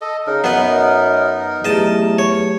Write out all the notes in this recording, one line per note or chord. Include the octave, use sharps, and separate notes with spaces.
A4 D#5
C#3 D#4 A#4
F#2 B3 B4 D#5
E2 F#3 A3 G4 D#5 A5
C#5